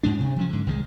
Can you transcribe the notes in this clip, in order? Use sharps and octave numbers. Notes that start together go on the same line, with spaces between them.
G#2 G#3 D4
C3
F3 F#3 C#4
G#2 D3
C2 D#3 F#3 G#3